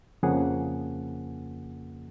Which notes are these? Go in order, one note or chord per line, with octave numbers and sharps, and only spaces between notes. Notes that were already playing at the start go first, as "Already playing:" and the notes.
F2 C#3 F3 A#3 G#4 F#5